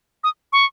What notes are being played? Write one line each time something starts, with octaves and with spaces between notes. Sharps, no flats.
D#6
C#6